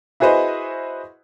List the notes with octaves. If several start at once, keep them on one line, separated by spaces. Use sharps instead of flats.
E4 F#4 G#4 B4 C5 D#5